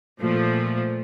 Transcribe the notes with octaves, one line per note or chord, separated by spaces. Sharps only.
A#2 F3 A3